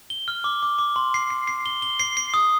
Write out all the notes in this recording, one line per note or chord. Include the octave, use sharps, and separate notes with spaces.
G7
F6
D6
D6
D6
C6
C7
C7
C7
G7
G7
C7
C7
D#6